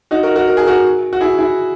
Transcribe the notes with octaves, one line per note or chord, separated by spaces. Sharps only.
D#4 F#4
F#4 A#4
F#4 A#4
A#4
G#4
F#4 A#4
F#4
E4 G#4
E4 G#4